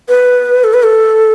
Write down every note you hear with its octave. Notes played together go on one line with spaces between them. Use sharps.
B4
A4
B4
A4